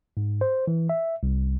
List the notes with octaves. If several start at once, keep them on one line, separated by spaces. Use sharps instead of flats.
G#2
C5
E3
E5
C2